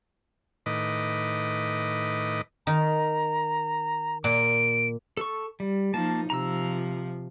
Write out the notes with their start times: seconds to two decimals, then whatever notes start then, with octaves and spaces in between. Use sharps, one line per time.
0.66 A2 D#3 B4 D#5 D6
2.67 D#3 A#5
4.24 A#2 D7
5.17 A4 C#6
5.60 G3
5.94 F3 A#3 D#4 A5
6.30 C3 F3 A#5 E6